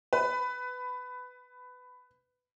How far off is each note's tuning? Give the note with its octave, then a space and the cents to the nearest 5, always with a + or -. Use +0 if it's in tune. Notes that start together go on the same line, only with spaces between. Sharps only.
B4 +15